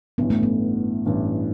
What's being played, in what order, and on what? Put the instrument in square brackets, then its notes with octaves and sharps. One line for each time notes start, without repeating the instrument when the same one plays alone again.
[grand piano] A1 G2 E3 [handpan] B3
[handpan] A3
B3
[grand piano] A1 G2 E3